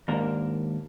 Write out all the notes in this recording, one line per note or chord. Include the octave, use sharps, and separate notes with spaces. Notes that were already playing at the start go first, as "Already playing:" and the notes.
D#2 G#2 A#3 D4 A#4